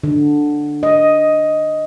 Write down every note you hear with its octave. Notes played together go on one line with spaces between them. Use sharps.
D3
D#5